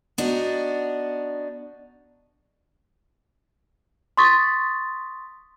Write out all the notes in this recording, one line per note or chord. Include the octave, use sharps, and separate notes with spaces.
B3 D4 D#4 F#4
C6 C#6 D#6 A6 B6